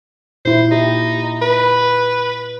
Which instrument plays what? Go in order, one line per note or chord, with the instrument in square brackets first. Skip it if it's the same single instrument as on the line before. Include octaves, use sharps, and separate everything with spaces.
[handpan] A#2 E4 [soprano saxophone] C5
[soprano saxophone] D#4 [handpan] G4
[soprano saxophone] B4